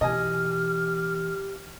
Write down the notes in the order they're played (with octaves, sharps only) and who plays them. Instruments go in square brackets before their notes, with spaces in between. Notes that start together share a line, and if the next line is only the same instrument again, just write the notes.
[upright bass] B2 E3 [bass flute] G4 [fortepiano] D#5 G#5 [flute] F6